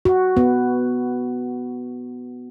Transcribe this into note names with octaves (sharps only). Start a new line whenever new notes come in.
F#4
B3